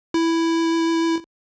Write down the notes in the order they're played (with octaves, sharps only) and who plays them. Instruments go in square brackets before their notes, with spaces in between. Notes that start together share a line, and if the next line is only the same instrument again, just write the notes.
[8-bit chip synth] E4